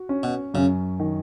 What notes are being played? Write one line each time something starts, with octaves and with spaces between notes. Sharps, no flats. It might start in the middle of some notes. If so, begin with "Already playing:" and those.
Already playing: F#4
C#4
B2
F#2 C#3
D#3